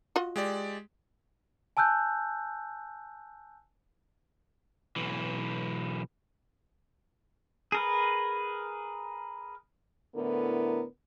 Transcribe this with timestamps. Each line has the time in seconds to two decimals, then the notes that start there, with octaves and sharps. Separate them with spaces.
0.16 F4 F#4 D#5
0.36 G#3 G4 D5
1.77 G#5 A5 E6 F#6 G6
4.96 B1 E3
7.72 G#4 A#4 B4
10.16 A2 D3 B3 E4 A#4